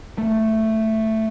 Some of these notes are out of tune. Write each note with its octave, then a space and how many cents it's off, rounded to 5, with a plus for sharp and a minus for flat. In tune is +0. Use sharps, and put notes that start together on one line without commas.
A3 +5